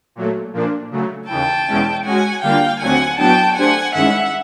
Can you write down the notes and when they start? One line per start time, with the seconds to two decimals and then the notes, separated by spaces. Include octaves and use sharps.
0.15 A#2 F#3 A3
0.53 A#2 F3 A#3 D4
0.91 C#3 F#3 A3
1.29 D#2 C#3 E3 G5 A5
1.67 E2 B2 G#3 C#4 E4
2.05 G#3 C#4 F#4 F#5 G#5
2.43 D3 G3 A#3 D4 F4 F5 G5
2.80 D#2 D3 F#3 A3 C4 F#5 G#5
3.18 A2 F#3 B3 D4 F#4 G5 A5
3.56 A3 D4 G4 C5 F#5 G#5
3.94 G2 D#3 G#3 C#4 E4 E5 F#5